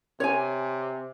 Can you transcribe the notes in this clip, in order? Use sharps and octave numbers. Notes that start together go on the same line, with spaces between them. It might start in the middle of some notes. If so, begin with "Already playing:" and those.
C3 C#5 G#5